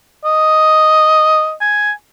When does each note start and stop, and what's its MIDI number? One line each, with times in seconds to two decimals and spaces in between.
0.25 1.53 75
1.61 1.91 80